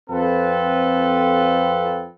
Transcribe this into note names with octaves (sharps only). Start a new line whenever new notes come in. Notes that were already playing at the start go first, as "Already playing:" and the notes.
F2 C4 F4 A4 B4